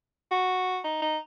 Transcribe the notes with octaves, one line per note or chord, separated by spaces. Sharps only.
F#4
D#4
D#4